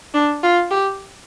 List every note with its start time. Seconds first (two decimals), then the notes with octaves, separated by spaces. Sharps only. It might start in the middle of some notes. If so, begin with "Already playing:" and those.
0.14 D4
0.43 F4
0.71 G4